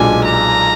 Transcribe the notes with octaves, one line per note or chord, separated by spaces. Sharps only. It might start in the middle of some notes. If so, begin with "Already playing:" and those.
Already playing: B1 A#2 G#3 D4 G#5
A#5